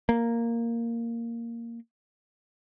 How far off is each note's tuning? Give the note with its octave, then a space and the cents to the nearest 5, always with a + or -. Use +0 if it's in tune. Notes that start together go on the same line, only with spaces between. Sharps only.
A#3 -5